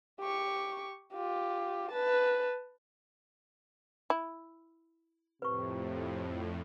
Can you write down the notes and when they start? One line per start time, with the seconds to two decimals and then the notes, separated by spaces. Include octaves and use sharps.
0.20 G4 C#6
1.13 F4 G4
1.91 B4 A5
4.10 E4
5.42 F2 A2 C3 B4 C#6